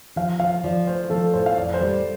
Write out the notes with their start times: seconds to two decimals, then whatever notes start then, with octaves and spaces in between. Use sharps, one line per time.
0.16 F3 F5
0.40 F3 F5
0.64 F3 D5
0.87 A3 C5
1.10 F3 A4
1.34 A2 C5
1.46 F5
1.57 F2 D5
1.74 C5
1.81 G3 D5